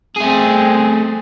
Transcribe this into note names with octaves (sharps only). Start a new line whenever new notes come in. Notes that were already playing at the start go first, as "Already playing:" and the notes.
A3 C4 G#4